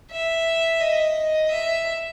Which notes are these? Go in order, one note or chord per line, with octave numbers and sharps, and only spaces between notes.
E5
D#5
E5